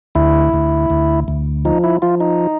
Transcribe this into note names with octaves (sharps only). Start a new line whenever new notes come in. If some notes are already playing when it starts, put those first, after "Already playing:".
D2 E4
D2
D2
D2
F3 D#4
E4
F3 F4
D#4